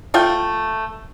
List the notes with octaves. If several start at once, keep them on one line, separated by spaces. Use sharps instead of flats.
A3 F4 G5